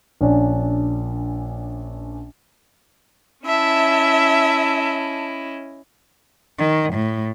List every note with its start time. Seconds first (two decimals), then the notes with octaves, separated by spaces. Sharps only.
0.21 A#1 C#4 D4
3.46 C#4 E4 D#5 E5 A5
6.58 D#3
6.92 A2